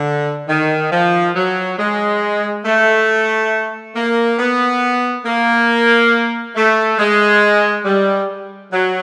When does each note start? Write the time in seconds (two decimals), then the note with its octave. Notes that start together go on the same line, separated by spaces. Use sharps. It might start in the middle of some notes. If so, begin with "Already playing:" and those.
Already playing: D3
0.48 D#3
0.92 F3
1.35 F#3
1.79 G#3
2.65 A3
3.95 A#3
4.39 B3
5.25 A#3
6.56 A3
6.99 G#3
7.85 G3
8.72 F#3